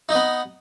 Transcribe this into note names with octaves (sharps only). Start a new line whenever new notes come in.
B3 D#4 D#5